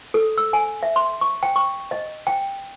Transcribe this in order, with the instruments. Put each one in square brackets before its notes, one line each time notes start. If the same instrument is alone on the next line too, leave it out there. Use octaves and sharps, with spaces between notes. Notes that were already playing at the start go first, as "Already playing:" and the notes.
[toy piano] A4
E6
G#5
E5
C6
C#6
G5
C#6
D#5
G5